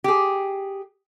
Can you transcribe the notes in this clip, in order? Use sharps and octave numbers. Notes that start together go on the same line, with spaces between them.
G4 G#4